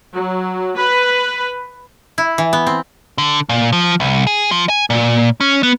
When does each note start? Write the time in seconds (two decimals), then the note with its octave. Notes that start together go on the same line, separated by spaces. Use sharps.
0.14 F#3
0.77 B4
2.18 E4
2.38 E3
2.53 B3
2.67 C4
3.18 D3
3.49 A#2
3.73 F3
4.00 C2
4.27 G#4
4.51 F3
4.69 G#5
4.90 A#2
5.41 C#4
5.63 B3